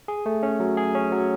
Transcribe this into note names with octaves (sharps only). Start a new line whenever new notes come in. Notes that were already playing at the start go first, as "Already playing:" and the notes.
G#4
A3
C#4
F#3
G#4
C#4
F#3